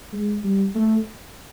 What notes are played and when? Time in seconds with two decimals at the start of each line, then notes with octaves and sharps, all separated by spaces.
0.13 G#3
0.44 G3
0.75 A3